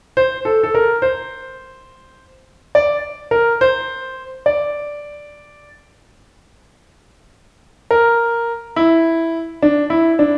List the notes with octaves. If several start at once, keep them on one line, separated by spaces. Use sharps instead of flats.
C5
A4
A4
A#4
C5
D5
A#4
C5
D5
A#4
E4
D4
E4
D4